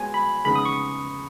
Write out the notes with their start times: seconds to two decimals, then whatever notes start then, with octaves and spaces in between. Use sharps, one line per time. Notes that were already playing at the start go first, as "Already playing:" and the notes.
Already playing: G#3 B3 F#4 C#5 G#5
0.14 B5
0.45 C#3 G#3 B3 D#4 G#4 B5
0.55 D#6
0.65 C#6